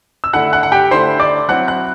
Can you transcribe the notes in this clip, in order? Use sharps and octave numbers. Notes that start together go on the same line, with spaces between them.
E6
D3 A3 E4 F#5 F#6
F#5 F#6
F#5
G4 G5
D3 A3 E4 C5 C6
D5 D6
F#3 C4 E4 F#5 F#6
F#5 F#6